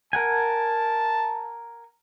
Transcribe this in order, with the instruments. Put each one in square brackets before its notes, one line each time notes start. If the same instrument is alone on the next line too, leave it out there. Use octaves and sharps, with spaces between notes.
[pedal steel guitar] A#4 F#5 G#5 [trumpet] A5